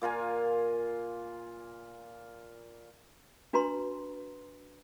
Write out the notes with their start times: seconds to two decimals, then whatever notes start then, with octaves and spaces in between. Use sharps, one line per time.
0.02 A#2 F4 A#4 G#5
3.53 D4 F#4 B4 A#5 C6